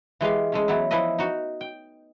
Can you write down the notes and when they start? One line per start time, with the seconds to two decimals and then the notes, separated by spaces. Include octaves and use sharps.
0.21 E3 G#3 G4 F5
0.52 G#3 A3 C#4
0.68 E3 F#3 B3 E4
0.91 E3 F3 E4 B4 D#5
1.18 D#4 F#4
1.61 G5